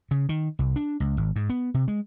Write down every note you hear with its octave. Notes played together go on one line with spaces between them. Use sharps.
C#3
D#3
C2
D4
C#2
G#1
G#2
B3
C3
G#3